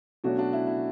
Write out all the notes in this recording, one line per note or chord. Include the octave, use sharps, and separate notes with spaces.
B2 F#3 A3 C#4 D4 F#4
D4 F#4
E4
E4